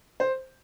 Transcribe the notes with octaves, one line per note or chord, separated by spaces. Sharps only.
C5